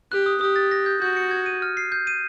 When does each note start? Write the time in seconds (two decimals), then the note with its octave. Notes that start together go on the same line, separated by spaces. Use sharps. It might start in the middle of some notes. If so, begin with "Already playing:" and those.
0.12 G4 F#6
0.26 D#6
0.41 G4 D#6
0.56 A6
0.71 A#6
0.86 G6
1.01 F#4 G6
1.17 C#7
1.31 G#6
1.46 D#7
1.62 F6
1.77 C7
1.92 G6
2.07 D#7